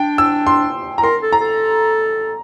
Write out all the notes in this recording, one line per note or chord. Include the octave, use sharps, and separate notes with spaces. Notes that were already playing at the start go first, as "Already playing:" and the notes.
Already playing: D4 G5
E6
C6
A#5
A#4 C6
A4
A#5
A4